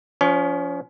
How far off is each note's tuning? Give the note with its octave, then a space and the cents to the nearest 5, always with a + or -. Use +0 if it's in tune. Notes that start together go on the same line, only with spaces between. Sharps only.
F3 +0 C#4 +35 C#5 +0